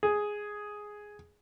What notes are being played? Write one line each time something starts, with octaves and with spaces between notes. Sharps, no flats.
G#4